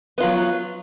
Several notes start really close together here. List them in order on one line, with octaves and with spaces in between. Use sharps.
B3 F4 F#3